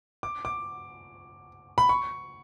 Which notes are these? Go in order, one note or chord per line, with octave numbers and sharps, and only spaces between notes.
D6
D6
B5
C#6